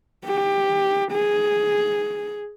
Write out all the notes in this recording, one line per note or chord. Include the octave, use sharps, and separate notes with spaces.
G4
G#4